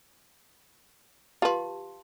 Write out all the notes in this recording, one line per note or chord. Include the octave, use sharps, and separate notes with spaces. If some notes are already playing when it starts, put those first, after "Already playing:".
F4 G4 B4 A5 C6